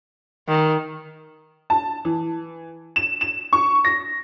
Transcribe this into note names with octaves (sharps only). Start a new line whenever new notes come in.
D#3
A5
E3
E7
E7
C#6
A#6